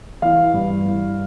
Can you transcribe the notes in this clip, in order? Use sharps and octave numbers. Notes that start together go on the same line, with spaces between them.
E3 F5
G2
E3